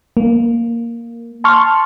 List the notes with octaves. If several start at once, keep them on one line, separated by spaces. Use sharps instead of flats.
A#3
A5 C6 C#6 F6